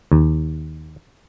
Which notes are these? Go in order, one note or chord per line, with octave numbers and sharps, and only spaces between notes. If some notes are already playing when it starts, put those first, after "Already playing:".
D#2